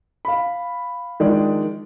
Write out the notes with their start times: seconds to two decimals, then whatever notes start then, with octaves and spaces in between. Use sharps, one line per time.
0.25 F5 B5
1.20 D#3 F3 G#3 D4 D5